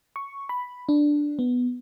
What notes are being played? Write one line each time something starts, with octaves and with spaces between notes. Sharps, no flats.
C#6
B5
D4
B3